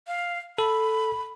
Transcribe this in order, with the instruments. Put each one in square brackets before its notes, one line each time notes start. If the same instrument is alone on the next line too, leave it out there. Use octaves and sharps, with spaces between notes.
[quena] F5
[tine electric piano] A4 [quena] B5